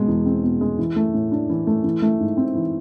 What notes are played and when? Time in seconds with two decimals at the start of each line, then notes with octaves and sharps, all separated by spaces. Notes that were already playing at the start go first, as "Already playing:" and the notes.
Already playing: B2 G#3
0.08 E2
0.26 C4
0.43 B2
0.61 G#3
0.79 E3
0.96 A3
1.14 A2
1.32 D4
1.50 E3
1.67 A3
1.84 E3
2.02 A3
2.20 G#2
2.37 C4
2.55 E3